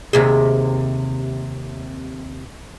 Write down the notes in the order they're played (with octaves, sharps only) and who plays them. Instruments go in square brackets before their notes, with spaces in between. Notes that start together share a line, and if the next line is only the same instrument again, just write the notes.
[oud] D#2 C3 G#4